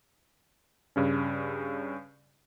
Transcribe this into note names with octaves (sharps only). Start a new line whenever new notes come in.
G2 C#3 C#4